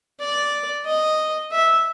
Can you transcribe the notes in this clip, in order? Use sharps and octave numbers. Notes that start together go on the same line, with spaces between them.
D5
D#5
E5